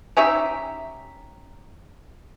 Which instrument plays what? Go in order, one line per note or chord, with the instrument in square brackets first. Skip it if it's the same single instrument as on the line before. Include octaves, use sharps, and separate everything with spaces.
[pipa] C#4 D#4 G4 E5